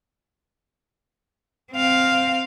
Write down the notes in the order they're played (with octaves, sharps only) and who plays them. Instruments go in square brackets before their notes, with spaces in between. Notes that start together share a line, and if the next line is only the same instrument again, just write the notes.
[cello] C4 F5